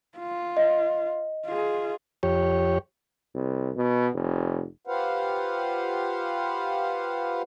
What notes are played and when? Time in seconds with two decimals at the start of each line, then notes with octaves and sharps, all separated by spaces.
0.18 F4
0.57 D#5
1.46 F4 G#4
2.23 F2 G4 C#5
3.35 C2
3.76 B2
4.14 F1
4.87 F4 G4 B4 C5 F5 F#5